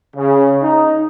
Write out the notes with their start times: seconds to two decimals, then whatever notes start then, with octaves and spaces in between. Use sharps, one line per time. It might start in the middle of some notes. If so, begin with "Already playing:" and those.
0.16 C#3
0.63 D#4